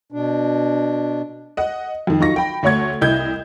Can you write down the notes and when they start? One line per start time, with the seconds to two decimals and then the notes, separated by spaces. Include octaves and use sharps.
0.12 B2 D4
1.57 D#5 F#5
2.07 F2 D#3
2.20 F#3 D#4 F4 C#6 A#6
2.36 G5 B5
2.63 D2 A3 C#5 F#5 C#6 G#6
3.01 C2 E4 D#5 G6 G#6